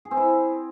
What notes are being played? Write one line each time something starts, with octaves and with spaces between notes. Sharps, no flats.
G#4
C4
E4